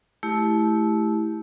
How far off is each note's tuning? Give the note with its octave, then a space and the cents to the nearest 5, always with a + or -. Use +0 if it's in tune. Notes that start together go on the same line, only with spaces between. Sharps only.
A3 -20 E4 -10 G4 +0